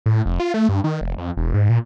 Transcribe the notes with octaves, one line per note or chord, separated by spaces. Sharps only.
A2
F1
F4
A3
G2
D#3
F1
F2
E1
G#2
A#2